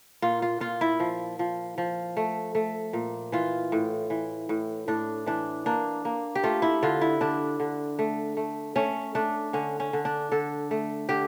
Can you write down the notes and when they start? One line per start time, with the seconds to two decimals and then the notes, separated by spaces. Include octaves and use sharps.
0.22 A#2 F4
0.42 F4
0.60 A#2 F4
0.81 E4
1.00 F3
1.39 F3
1.78 F3
2.17 A3
2.55 A3
2.93 A#2
3.32 E3 F4
3.72 A2
4.10 E3
4.49 A2
4.88 A2 D4
5.26 E3 D4
5.66 A#3 D4
6.05 A#3
6.35 G4
6.43 A3 F4
6.62 E4
6.83 D3 F4
7.01 E4
7.21 D3 D4
7.60 D3
7.99 A3
8.37 A3
8.76 A3 C#4
9.15 A3 D4
9.53 D3 C#4
9.80 C#4
9.93 D3
10.05 D4
10.32 D3 A4
10.71 A3
11.09 D3 G4